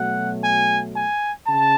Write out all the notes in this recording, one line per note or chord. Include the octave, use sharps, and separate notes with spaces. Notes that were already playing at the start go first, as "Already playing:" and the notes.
Already playing: B2 F#3 A3 F#5
G#5
G#5
C#3 A5